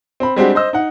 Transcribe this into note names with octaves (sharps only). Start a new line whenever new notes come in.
C4 B5
G3 G#3 C4 D4 F#4 G4
C5 D#5 E6
D#4 F#5